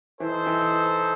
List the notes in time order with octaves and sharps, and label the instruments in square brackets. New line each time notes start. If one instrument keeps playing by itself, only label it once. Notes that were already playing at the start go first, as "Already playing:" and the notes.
[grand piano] E3 [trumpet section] D#4 A4 C5
[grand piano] E3